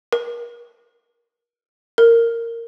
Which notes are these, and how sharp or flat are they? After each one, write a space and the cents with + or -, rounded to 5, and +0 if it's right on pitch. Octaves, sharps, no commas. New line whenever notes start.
A#4 +35
A#4 -10